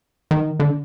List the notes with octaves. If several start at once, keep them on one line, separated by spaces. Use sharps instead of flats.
D#3
D3